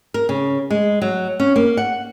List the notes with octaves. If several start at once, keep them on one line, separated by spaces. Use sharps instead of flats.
A#4
C#3
G#3
F#3
C#4
A#3
F#5